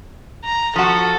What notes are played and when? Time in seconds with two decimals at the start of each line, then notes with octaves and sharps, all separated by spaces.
0.45 A#5
0.76 F3 F#4 A4